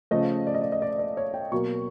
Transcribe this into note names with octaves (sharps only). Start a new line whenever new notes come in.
C#3 F3 A3 D#5
D5
D#5
D5
D#5
D5
D5
C#5
G5
B2 F#3 A#3 C#6